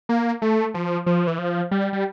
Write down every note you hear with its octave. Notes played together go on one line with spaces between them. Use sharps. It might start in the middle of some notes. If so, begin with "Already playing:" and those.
A#3
A3
F3
F3
E3
F3
G3
G3